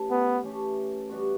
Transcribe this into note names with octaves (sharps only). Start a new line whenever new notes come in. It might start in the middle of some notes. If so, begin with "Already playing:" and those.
Already playing: E3 A3 C#4 G4
B3
E3 A3 C#4 G4
E3 G3 B3 F#4